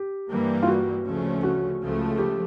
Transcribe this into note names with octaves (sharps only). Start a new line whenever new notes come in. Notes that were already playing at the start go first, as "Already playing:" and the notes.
Already playing: G4
G2 E3 G3 A#3
F4
F#4
D2 C#3 F3 A3 C#4
F#4
C#2 C#3 F3 A3
G4